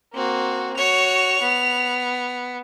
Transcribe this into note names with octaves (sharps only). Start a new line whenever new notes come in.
A#3 C4 F#4
F#4 C#5 F7
B3